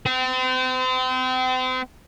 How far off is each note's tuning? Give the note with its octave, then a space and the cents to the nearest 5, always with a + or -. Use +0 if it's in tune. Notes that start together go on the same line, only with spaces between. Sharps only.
C4 -35